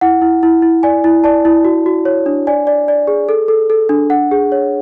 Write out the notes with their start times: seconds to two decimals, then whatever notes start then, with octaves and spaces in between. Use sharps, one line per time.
0.01 E4 F#5
0.22 E4
0.43 E4
0.62 E4
0.83 D5 G#5
1.04 E4
1.24 D5 A5
1.45 E4
1.65 F#4
1.86 F#4
2.05 C#5
2.26 D4
2.47 D5 G#5
2.67 D5
2.88 D5
3.07 G#4
3.29 A4
3.48 A4
3.70 A4
3.89 D4
4.10 D4 F#5
4.31 G#4
4.52 C#5